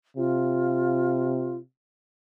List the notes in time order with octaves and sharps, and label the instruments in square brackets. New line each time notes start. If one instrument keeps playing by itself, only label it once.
[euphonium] C3 [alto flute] F4